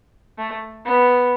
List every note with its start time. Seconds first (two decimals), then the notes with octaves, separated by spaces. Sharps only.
0.38 A3
0.85 B3